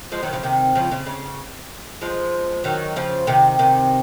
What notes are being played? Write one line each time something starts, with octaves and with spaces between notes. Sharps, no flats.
F3 G#3
D#3 F#3
C#3 F3
C3 D#3
C#3 F3
C#3
C#3
F3 G#3
D#3 F#3
C#3 F3
C3 D#3
C3 D#3